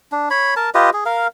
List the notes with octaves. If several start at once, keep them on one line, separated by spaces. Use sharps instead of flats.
D4
C#5 B5
A#4 A5
F4 G4 B4 D#5
G#4
A#4 F5